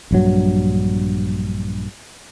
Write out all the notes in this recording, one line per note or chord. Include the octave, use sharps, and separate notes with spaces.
A#1 G2 F#3